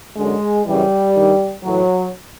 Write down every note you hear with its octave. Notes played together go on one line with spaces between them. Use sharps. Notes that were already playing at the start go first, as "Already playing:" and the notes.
F#2 D3 G#3
F#2 C#3 E3 G3
G2 D#3
A2 E3 F#3